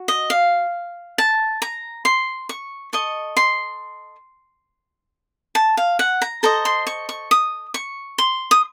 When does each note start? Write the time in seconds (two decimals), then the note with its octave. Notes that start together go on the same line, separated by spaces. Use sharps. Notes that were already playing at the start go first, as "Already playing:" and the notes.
Already playing: F#4
0.08 D#5
0.30 F5
1.18 A5
1.62 A#5
2.05 C6
2.49 C#6
2.93 A4 D#5 C#6
3.37 C6
5.55 A5
5.77 F5
5.99 F#5
6.22 A#5
6.43 A4 C5 D#5 A#5
6.65 C6
6.87 C#6
7.09 C#6
7.31 D#6
7.74 C#6
8.18 C6
8.51 D#6